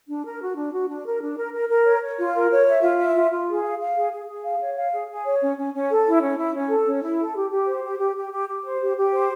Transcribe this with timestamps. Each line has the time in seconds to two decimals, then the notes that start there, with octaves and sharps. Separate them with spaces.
0.08 D4
0.24 A#4
0.41 F#4
0.56 D4
0.72 F#4
0.88 D4
1.05 A#4
1.21 D4
1.36 A#4
1.53 A#4
1.69 A#4
1.86 C#5
2.01 C#5
2.18 F4
2.34 A#4
2.50 C#5
2.66 E5
2.82 F4
2.99 E5
3.15 F4
3.31 F4
3.47 G#4
3.63 F5
3.80 F5
3.95 G#4
4.12 G#4
4.28 G#4
4.44 F5
4.60 C#5
4.76 F5
4.92 G#4
5.09 G#4
5.25 C#5
5.41 C#4
5.57 C#4
5.74 C#4
5.90 A4
6.06 E4
6.21 C#4
6.38 E4
6.55 C#4
6.70 A4
6.86 C#4
7.03 E4
7.19 A4
7.35 G4
7.51 G4
7.67 C5
7.83 G4
7.99 G4
8.16 G4
8.32 G4
8.48 G4
8.64 C5
8.80 G4
8.97 G4
9.13 C5